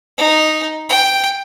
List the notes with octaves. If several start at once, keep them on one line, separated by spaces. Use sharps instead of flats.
D#4
G5